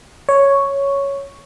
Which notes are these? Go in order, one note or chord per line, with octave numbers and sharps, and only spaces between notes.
C#5